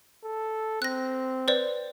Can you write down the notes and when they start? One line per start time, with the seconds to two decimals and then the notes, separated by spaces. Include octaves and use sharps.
0.24 A4
0.82 C4 F#6 A#6
1.48 B4 C5 D5